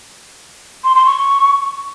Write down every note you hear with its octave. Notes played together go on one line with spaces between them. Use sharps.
C6
C6
C#6